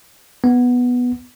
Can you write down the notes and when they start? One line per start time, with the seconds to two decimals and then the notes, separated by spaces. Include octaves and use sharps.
0.44 B3